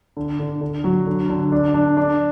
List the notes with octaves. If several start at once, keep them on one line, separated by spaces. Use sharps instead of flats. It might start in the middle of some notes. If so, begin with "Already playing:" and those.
D3
D3
D3
F#3
D3
D3
D4
D4
D4